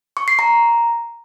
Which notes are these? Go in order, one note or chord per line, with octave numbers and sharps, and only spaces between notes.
C#6
C7
A#5